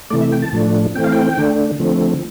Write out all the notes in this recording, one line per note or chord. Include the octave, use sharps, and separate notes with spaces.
C3 E3 A3 D5
E5
G5
A5
A2 F3 A3 D4
E3 A3 C4 G5
F5
G5
D3 A3 D4
D3 F3 A3 C4